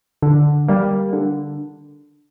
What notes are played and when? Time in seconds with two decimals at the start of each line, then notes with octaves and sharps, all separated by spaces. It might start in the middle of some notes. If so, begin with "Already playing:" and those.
0.22 D3
0.68 G3 A#3
1.13 D3